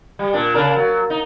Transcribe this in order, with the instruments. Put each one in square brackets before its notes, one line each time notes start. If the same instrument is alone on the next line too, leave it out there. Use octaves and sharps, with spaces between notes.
[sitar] G3
A#2 D4
C#3 D4 A#4
F#3
D#4